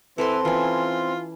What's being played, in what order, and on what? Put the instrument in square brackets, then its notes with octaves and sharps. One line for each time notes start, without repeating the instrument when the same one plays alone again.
[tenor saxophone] E3 [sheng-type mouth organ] C4 [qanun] A4 B4 C6
[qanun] E3 C#4 [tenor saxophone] F4